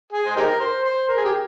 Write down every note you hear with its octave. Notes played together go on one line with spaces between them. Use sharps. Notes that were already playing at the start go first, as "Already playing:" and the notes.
G#4
C5
D#4 G4 A#4
C5
C5
A#4
G#4
G4